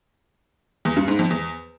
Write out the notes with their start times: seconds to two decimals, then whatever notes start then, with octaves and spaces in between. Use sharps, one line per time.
0.85 E2
0.96 G2
1.08 G#2
1.19 F2
1.30 E2